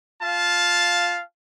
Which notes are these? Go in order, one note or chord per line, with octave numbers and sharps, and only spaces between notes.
F4 F5 A5